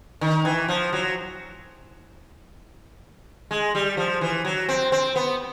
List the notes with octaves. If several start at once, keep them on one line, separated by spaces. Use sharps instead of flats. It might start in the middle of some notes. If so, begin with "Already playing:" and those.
D#3
E3
F3
F#3
G#3
G3
F3
E3
F#3
C4
C4
B3